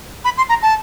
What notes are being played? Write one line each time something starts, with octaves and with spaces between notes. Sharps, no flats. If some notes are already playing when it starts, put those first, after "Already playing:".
B5
C6
A#5
A5